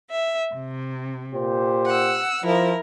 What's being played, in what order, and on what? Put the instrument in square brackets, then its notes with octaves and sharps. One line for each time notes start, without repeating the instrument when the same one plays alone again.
[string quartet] E5
C3
[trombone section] A#2 G4 C5
[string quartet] F#5 E6
[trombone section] F3 [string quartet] E4 A#4